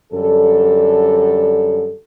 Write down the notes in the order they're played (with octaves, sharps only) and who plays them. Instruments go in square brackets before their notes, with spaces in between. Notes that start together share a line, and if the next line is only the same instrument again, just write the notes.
[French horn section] F#2 D3 G3 A4